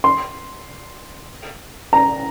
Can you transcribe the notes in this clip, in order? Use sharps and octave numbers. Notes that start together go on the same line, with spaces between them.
C6
A#5